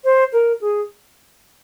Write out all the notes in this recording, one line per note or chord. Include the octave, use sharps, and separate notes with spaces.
C5
A#4
G#4